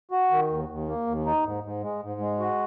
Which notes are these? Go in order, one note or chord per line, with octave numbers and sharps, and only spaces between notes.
F#4
D#3
D#2
D#2
A#3
D#2
D#4
G#2
G#2
G#3
G#2
G#3
F#4